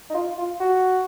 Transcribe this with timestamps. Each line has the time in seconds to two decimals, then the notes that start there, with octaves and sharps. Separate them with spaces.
0.10 D#4
0.15 F4
0.38 F4
0.60 F#4